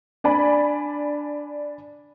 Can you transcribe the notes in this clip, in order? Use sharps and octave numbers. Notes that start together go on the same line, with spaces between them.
D4 D5 G#5 B5